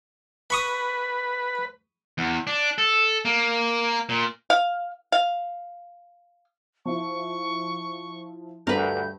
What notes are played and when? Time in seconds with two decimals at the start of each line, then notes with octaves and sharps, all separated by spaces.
0.50 B4 B5 C#6 D#6
2.18 E2
2.47 D4
2.78 A4
3.25 A#3
4.09 A#2
4.50 F5
5.12 F5
6.85 F3 E4 C#6
8.67 D2 G2 A#4 B4 G6